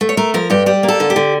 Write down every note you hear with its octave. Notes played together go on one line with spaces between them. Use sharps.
A3
C#5
A3 A#4
F3 A#4
G2 G4
G3 G4
A#3
A4
D3
G4
D3